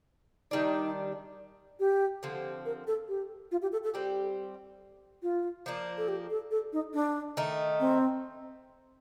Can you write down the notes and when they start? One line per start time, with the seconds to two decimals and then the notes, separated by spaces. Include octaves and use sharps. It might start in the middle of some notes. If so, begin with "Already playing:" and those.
0.51 D#3 G3 D4 D#4
1.80 G4
2.23 D3 F3 C4
2.66 A#4
2.87 A4
3.09 G4
3.52 F4
3.62 G4
3.72 A4
3.84 A4
3.94 G3 C4 G4
5.23 F4
5.66 F3 A#3 D4
5.98 A4
6.08 G4
6.30 A4
6.51 A4
6.73 D#4
6.94 D4
7.37 D#3 A3 D#4
7.80 C4